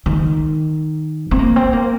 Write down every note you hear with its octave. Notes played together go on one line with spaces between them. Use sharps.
D#3
C4
A#3
C4
A#3